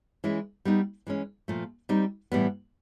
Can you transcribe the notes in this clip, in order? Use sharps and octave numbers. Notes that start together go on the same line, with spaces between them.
E3 G#3 C#4 E4
G3 B3 D#4
E3 G#3 C#4
A#2 F3 A3
G3 C4 D#4
A2 E3 G3 B3